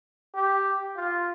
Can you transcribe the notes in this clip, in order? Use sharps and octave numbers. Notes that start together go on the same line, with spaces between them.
G4
F4